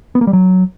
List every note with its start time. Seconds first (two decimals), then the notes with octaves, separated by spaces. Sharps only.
0.15 B3
0.21 A#3
0.27 G3
0.33 F#3